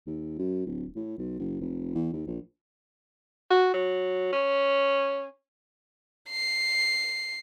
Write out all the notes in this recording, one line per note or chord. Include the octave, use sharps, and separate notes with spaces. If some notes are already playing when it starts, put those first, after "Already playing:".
D#2
F#2
D1
A2
B1
F#1
F1
E2
D#2
A#1
F#4
F#3
C#4
C7